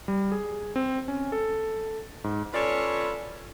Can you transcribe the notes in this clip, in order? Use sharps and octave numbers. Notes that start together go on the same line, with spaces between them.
G3
G#4
C4
C#4
A4
G#2
C#4 F4 A4 B4 C#5 D5